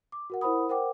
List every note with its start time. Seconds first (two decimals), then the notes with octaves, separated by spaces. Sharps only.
0.12 D6
0.30 F#4 A#4 F#5
0.41 E4 A#4 C5 F#5 B5 D#6
0.69 A#4 C5 F#5 G5 D6